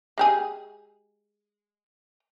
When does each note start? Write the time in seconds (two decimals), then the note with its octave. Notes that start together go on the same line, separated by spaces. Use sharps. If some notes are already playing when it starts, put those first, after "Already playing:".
0.18 G#3 G4 G#4